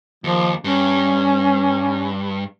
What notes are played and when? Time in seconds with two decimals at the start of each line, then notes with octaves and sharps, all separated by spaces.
0.24 D#2 F3
0.64 G2 C#4